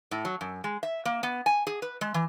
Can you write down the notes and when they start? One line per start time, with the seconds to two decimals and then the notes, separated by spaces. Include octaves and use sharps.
0.11 A2
0.25 F#3
0.41 F#2
0.64 G#3
0.83 E5
1.05 A#3
1.23 B3
1.46 G#5
1.67 G#4
1.82 B4
2.01 G#3
2.14 E3